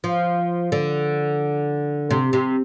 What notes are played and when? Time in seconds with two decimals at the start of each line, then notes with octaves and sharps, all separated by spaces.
0.04 F3
0.72 D3
2.11 C3
2.33 C3